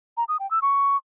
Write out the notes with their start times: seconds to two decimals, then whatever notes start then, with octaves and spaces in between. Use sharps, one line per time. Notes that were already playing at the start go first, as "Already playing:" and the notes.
0.17 A#5
0.28 D#6
0.40 G5
0.51 E6
0.62 C#6